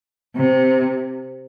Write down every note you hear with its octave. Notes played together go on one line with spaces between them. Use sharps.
C3